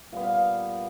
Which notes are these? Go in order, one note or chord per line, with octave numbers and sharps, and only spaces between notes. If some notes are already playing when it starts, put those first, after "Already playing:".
A#2 G3 B3 F5
F5
F5